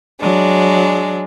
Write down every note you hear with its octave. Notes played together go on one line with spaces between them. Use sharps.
F#3 G#3 D4